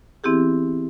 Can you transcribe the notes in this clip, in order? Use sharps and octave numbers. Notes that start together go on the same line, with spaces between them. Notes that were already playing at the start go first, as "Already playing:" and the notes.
E3 B3 C4 E4 G4 G#4